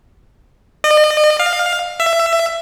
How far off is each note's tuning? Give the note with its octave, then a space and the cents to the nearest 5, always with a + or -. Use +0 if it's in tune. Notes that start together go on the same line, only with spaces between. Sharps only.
D#5 -40
F5 +15
E5 +20